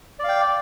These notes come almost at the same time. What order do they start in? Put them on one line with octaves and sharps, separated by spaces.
D5 F5 G5